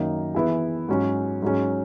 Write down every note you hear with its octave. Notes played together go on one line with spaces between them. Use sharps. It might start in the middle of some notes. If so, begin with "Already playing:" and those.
Already playing: F#2 D#3 A#3 D#4
E3 B3 E4 G#4
G#2 F#3 C#4 G#4
G#2 F#3 C#4